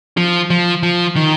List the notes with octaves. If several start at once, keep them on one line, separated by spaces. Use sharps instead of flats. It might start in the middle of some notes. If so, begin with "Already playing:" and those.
F3
F3
F3
D#3